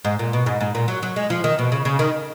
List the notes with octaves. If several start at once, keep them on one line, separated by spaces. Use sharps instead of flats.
G#2
A#2
B2
G#2
G#2
A#2
F#3
F#3
G#3
F3
D#3
B2
C#3
C#3
D#3